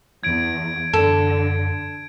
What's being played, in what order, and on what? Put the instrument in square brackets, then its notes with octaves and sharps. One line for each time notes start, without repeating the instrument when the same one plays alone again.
[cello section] E2 [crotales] G#6 D7
[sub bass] F#2 [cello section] D3 [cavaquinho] A4